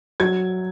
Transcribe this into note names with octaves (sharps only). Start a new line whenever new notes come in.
F#3 G#6